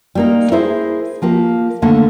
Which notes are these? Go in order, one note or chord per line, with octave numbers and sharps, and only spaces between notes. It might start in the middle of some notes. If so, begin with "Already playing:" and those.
G3 A#3 D#4
E4 G#4 A#4 C5
F3 A#3 G4
D#2 D3 A3 A#3 A4